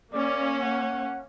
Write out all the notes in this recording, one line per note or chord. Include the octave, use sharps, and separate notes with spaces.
A#3 C#4 D5
F#5